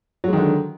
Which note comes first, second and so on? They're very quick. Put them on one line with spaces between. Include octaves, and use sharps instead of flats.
F#3 G#3 D#3 D3